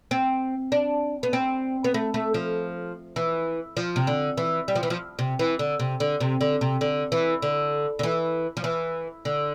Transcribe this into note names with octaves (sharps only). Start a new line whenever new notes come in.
C4
D4
B3
C4
B3
A3
A3
F3
E3
F3
C3
D3
E3
G3
F3
E3
F3
C3
E3
D3
C3
D3
C3
D3
C3
D3
E3
D3
D3
E3
F3
E3
D3